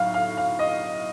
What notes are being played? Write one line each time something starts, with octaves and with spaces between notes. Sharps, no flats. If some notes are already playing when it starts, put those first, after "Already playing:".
Already playing: B1 A2 F#3 F5
F5
F5
D#5